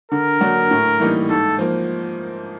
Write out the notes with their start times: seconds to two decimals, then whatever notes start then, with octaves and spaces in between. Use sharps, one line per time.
0.11 D3 A#4
0.41 F#3 A#3 D4 F#4
0.71 A2
1.00 E3 G3 A#3 D#4
1.29 G#2 A4
1.58 F3 A#3